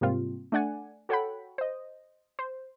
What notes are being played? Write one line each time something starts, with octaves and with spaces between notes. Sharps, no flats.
G#2 C3 G3 A#3 C4 F4
A3 D4 D5 F#5 G#5
F#4 A4 C#5 F#5 G5 B5
C5 D#5
C5